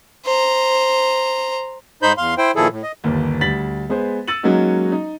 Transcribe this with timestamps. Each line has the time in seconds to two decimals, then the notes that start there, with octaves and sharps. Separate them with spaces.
0.25 C5 A#5
2.02 G#2 D#4 C5 B5 G6
2.18 E2 F5 C6
2.38 E4 C5 G5
2.56 A#2 D#3 F3 E4 G#4 A4
2.71 A2
2.83 D#5
3.04 G1 D#2 A#3
3.41 D2 G3 A6 B6 F#7
3.89 G#3 B3 G#4 C5
4.28 E6 A6 C#7 D#7 F#7
4.43 F#3 G#3 A#3 C#4 D#4 F#4
4.92 D#4